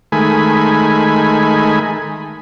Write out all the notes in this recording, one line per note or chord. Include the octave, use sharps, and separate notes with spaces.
D#3 G#3 A3 G#5 B5